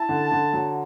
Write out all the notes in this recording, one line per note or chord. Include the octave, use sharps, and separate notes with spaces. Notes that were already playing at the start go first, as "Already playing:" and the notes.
Already playing: E4 A5
D3
D3
F#3